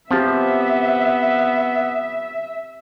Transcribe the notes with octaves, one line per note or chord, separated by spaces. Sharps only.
F3 B3 C4 G4 E5